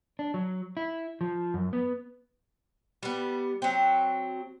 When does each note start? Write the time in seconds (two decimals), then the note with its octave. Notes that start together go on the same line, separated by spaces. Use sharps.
0.19 D4
0.34 F#3
0.77 E4
1.21 F3
1.54 F#2
1.73 B3
3.03 G3 B3
3.62 F#3 C4